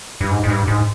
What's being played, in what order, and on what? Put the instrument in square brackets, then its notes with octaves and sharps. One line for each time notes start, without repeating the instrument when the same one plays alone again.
[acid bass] G2
G#2
G#2
G2
G#2